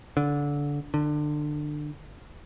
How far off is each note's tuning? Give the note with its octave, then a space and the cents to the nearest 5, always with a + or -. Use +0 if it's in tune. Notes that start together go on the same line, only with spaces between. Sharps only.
D3 -20
D3 +25